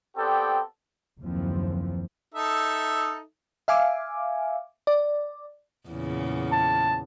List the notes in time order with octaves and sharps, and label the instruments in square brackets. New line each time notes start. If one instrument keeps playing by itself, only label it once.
[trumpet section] B3 C4 G4 A4 D5 G5
[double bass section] F#1 D#2 E3 F3 C4
[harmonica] D#4 A4 E5
[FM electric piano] E5 F5 G#5 D6
D5
[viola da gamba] E2 A#2 C#3
[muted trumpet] A5